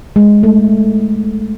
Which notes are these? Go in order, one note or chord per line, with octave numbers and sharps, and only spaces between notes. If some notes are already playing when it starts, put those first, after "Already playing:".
G#3
A3